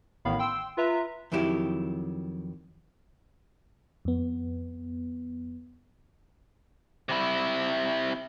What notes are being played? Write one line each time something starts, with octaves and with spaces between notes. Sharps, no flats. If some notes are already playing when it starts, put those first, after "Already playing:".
A1 A2 D#3 B3 F5 B5
G5 C6 E6
F4 B4 E5 A#5
F2 D#3 F#3 E4 G4
F2 B3
C3 E4